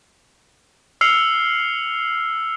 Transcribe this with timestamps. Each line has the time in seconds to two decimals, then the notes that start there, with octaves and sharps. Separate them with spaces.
1.01 E6 F6 C7 C#7 F7